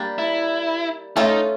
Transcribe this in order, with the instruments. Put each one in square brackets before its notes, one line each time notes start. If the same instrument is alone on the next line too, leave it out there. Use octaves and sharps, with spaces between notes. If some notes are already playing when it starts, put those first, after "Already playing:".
Already playing: [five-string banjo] G3 A#3 D4
[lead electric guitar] E4
[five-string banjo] A3 C#4 F4 A4 [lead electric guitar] D#4